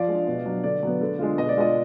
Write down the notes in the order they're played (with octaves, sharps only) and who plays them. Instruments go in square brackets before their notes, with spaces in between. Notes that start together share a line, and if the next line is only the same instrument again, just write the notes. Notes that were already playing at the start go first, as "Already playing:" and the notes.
Already playing: [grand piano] F3 D5 F5
G#3 D4
B2
F#3 D4
D3 D5
F#3 B3
D3
G#3 D4 F4
B2 D#5
D5
G#3 D4 F4 D#5